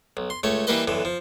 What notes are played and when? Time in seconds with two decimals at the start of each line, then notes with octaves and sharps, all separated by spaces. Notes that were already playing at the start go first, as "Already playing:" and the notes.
0.17 B1
0.30 C6
0.43 C#2 A3 C#5
0.67 E3 G3 A#3 B4 D#5
0.88 B1 D3 E3
1.05 F3